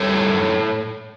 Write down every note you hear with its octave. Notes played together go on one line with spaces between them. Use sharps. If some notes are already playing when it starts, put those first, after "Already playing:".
Already playing: G3 A4 C#5
A2
F#2